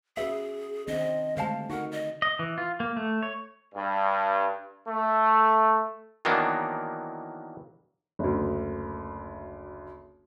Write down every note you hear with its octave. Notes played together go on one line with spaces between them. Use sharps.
C#4 F#4 G#4 B4 E5
D#3 C4 D4 D#5
D3 G#3 A3 G4 C5 F5 A5
D#4 F#4 A#4 F#5
D#5
D#5
E3
F4
A#3
A3
C#5
G2
A3
D#3 E3 F#3 A#3 B3 D4
F#1 D2